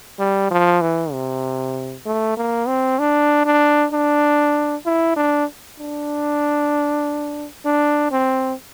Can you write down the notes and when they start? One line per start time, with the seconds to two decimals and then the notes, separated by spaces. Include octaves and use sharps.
0.19 G3
0.51 F3
0.82 E3
1.12 C3
2.05 A3
2.37 A#3
2.68 C4
2.99 D4
3.45 D4
3.92 D4
4.85 E4
5.17 D4
5.79 D4
7.65 D4
8.11 C4